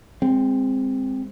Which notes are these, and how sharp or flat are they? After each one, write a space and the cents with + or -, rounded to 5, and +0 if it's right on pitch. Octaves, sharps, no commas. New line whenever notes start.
G#3 -30 C4 +0